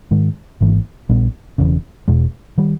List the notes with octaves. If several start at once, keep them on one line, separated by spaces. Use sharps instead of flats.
G#2 D#3 G#3
G#1 G#2 E3 A#3
A#1 A#2 G3 B3
E1 E2 C#3
E1 E2 B2 G#3
D#3 G3